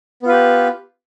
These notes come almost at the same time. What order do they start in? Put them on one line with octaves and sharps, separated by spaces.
B3 F4 B4 G4